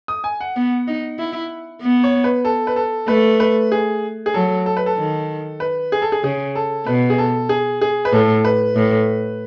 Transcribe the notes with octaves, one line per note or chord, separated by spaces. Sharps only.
D#6
G#5
F#5
B3
D#4
E4
B3
C#5
B4
A4
B4
A4
A3 B4
B4
G#4
G#4
F#3 A4
A4
B4
A4
D#3
B4
G#4
A4
G#4
C#3 G#4
A4
B2 B4
G#4
A4
G#4
G#4
B4
A2 A4
B4
A2